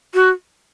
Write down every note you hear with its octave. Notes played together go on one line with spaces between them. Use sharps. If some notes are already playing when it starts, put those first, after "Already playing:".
F#4